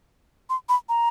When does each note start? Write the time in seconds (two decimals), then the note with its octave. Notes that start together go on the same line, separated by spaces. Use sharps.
0.50 C6
0.69 B5
0.89 A#5